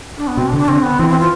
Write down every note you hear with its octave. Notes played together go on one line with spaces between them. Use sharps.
D4
B3
B2 C4
D4
D3
D4
D3 C4
B3
E3 C4
C4
F4